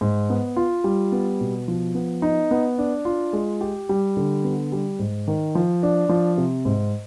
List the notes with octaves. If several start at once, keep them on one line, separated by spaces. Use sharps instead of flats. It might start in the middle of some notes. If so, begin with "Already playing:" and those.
G#2
B3
F4
G3
B3
B2
F3
B3
D#4
B3
D4
F4
G#3
G4
G3
D3
B3
G3
G#2
D#3
F3
D4
F3
C3
G#2